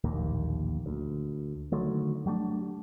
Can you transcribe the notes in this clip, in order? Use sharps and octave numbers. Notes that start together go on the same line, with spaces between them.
D1 A#1 D#2 A#3
D2
D3 D#3 F#3 A3
F#3 G3 A3 D4